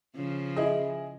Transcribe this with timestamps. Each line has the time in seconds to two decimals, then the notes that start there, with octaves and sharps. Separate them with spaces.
0.16 C#3 F3
0.56 E4 G#4 D#5